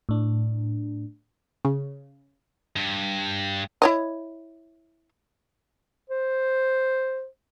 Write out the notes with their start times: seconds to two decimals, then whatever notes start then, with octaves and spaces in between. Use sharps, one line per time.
0.09 A2 D4
1.65 C#3
2.76 G2
3.82 E4 C#5 D#5
6.10 C5